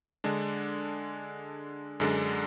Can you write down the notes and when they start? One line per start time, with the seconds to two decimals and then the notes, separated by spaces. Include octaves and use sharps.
0.24 D3 G#3 D4
2.00 F#2 D3 G#3 D4